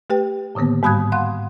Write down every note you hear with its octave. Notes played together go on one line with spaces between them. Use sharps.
A3 G4 B4 G5
A2 D3 D#3 A#3 B3
G#2 G3 B5 D#6 F#6 G#6
F5 F#5 C6 F#6